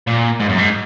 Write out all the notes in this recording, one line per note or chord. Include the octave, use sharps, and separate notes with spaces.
A#2
G#2
F#2
G#2